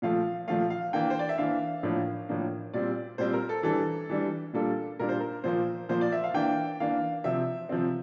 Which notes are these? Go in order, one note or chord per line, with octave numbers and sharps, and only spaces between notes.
A#2 F3 A3 F5
A#2 F3 A3 F5
F5
E3 A#3 D4 G5
C5
D5
E5
E3 A#3 D4 F5
A2 F3 A#3 D4
A2 F3 A#3 D4
A#2 G3 C4 D5
A#2 G3 C4 C5
A#4
A4
E3 G3 D4 A4
E3 G3 D4
A#2 G3 A#3 D4 A4
A#2 G3 A#3 D4 A#4
C5
A#4
A#2 F3 A#3 C5
A#2 F3 A#3 C5
D5
E5
F5
E3 A#3 D4 G5
E3 A#3 D4 F5
C3 F3 C4 E5
C3 F3 C4